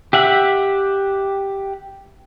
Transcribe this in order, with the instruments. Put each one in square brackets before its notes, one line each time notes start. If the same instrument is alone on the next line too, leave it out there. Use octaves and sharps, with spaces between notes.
[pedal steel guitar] G4 E5 F#5